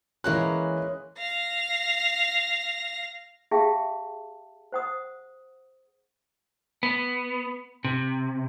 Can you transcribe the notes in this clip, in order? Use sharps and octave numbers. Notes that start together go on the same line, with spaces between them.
E3 G#3 A#3 C#4 F#6
F5 A#6
G4 G#4 E5 F5 G5 A5
C5 F#5 D#6
B3
C3